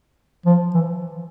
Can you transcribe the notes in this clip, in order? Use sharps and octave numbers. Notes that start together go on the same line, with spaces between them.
F3
E3